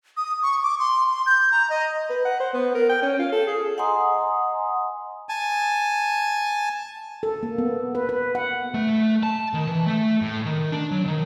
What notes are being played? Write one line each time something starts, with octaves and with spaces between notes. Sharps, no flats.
D#6
C#6
D6
C6
C6
G6
A#5
D#5
B4
F#5
C5
B3
A#4
G5
C#4
F4
A4
G#4
D#5 F#5 G#5 A#5 C6 D#6
G#5 A5
A4
A#3
B3
B4
B4
F#5
A3
A5
D#3
E3
A3
A2
D#3
D4
F#3
D#3